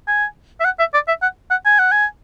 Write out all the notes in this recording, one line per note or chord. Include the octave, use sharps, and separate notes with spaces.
G#5
E5
F#5
E5
D5
E5
F#5
F#5
G#5
F#5
G#5